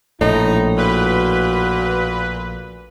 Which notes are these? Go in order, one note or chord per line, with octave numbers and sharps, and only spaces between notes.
A#1 A2 D#4 E4
A#2 F#4 B4